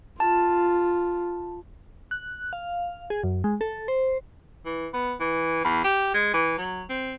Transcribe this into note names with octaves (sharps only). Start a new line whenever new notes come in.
F4 A5
F#6
F5
G#4
F#2
G#3
A4
C5
E3
B3
E3
E2
G4
G#3
E3
F#3
C4